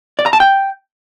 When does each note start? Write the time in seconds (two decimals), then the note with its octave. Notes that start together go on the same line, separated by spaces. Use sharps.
0.19 D5
0.26 A#5
0.33 A5
0.40 G5